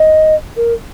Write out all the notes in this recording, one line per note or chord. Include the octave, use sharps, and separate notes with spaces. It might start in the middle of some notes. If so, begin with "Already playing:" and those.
Already playing: D#5
A#4